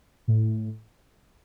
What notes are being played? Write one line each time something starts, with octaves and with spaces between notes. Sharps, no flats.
A2